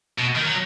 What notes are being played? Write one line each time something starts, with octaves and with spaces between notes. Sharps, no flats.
B2
D#3
F#3